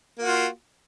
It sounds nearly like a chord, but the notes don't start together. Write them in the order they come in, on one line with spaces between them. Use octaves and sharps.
A#3 F#4 F4